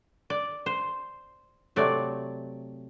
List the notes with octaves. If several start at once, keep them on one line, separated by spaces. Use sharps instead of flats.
D5
C5
C3 F#3 A3 D5